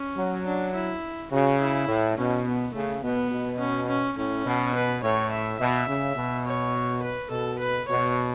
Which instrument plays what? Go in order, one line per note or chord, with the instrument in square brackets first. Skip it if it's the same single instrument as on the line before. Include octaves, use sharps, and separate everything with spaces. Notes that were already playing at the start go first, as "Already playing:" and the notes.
Already playing: [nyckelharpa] C#4
[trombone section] F#3
[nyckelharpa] D4
E4
[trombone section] C#3 [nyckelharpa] F#4
[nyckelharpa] E4
[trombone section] A2
[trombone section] B2 [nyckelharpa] C#4
[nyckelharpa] B3
[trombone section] C#3 [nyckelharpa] A3
[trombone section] B2 [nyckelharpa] B3
[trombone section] B2
[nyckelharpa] C#4
C#4
[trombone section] A2 [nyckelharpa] C#4
[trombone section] B2
[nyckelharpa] B4
[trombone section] A2 [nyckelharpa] C#5
[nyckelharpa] E5
[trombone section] B2 [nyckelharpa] E5
[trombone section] C#3
B2
[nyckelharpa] C#5
B4
[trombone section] B2 [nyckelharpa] A4
[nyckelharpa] B4
[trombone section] B2 [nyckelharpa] C#5